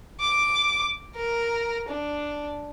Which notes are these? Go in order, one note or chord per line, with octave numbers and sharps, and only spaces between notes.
D6
A#4
D4